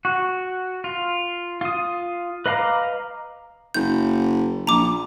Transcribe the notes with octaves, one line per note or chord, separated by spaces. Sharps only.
F#4
F4
F4 D#6
B4 D#5 F5 A#5 D6
F#1 G6
A#1 A#5 D6